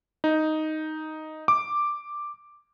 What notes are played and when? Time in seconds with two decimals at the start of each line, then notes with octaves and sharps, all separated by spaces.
0.24 D#4
1.48 D6